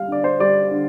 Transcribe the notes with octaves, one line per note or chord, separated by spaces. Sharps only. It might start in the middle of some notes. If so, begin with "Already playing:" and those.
Already playing: G3 F5
D3 D5
C5
G3 D5
D3